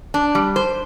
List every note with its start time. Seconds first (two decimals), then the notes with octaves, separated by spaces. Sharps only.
0.14 D4
0.35 G3
0.56 C5